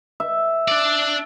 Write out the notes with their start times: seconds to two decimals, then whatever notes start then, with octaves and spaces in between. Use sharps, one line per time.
0.20 E5
0.68 D4 D5